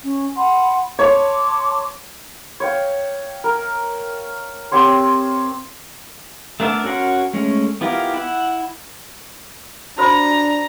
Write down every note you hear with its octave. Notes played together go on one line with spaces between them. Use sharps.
C#4
F#5 B5 C6
C#5 A5 C6 D6
C#5 F5 G5
A#4
C4 G4 C#5 C6
A3 B3 D4 A#4 E5
C#4 F#4 A#4 F#5 C6
G#3 A3 C#4
B3 E4 F4 G4 A#4
E4 F#5
D4 F#4 C5 A#5 B5